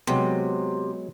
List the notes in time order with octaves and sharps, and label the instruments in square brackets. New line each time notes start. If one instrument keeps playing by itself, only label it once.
[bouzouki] C3 [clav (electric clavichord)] F#3 G#3 B3